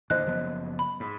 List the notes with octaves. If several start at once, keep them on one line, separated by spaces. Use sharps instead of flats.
D#2 A2 D3 C5 D#5 F#6
F#1 F3 B3
B5
G#2